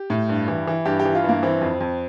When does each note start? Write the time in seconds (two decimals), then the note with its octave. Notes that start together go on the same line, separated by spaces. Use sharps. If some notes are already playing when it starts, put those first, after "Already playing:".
Already playing: G4
0.10 A2
0.29 G2
0.48 E3
0.67 E3
0.85 G2 G4
1.00 G4
1.05 E3
1.15 F4
1.24 G2 A#3
1.43 E3 C4
1.61 F2
1.80 F2